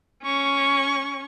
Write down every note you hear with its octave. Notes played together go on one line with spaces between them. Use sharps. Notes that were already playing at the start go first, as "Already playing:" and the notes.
C#4 C#6